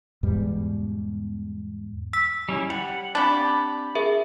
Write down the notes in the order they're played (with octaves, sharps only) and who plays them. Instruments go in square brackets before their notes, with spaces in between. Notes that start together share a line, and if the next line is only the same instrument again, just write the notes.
[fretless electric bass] E2 G#2 B2 G3
[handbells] E6 B6
[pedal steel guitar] G3 C#4 E4
[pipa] G3 [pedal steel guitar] F#5
[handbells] C4 A6 [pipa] D4 G4 [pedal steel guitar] B5
[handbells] G#4 A#4 E5